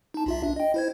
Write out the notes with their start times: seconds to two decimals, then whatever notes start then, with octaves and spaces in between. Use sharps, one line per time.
0.14 D#4 A5
0.26 B1 F4 E5
0.43 D4
0.56 D#5 G5
0.74 E4 C5 G#6